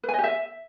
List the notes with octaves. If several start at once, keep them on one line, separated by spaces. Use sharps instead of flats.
B4
G#5
D#5
G4
E5